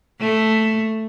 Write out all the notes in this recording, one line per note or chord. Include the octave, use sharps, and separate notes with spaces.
A3